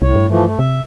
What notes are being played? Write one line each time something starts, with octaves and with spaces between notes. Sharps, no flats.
C2 A2 C#5
G2
E3 F3 A3
A3
C3 E5